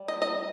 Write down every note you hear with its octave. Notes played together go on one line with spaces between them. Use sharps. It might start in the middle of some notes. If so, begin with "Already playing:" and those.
Already playing: G3
D#5
D#5